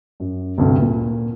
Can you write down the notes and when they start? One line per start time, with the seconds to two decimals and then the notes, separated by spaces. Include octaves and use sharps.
0.20 F#2
0.58 D2 G2 C3 A3
0.80 A#2